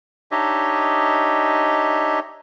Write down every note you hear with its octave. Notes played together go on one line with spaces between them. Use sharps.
D4 D#4 G4 C#5 D#5 E5